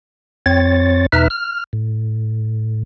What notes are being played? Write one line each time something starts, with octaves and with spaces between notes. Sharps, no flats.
F2 C4 C#5 A6
E2 B2 D#4 B4 E5 F6
F6
A2